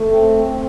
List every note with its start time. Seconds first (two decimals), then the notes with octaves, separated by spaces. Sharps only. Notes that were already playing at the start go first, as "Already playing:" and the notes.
Already playing: A3
0.11 C4
0.51 C4